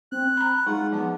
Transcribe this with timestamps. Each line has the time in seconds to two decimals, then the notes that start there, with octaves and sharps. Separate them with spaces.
0.12 C4 F#6
0.37 A#5 B5
0.67 G#3 D#4 F4 F#5
0.92 F3 B3 A5